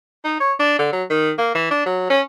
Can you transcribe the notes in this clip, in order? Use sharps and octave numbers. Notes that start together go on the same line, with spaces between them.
D#4
C#5
D4
D3
F#3
D#3
A#3
E3
D4
F#3
C#4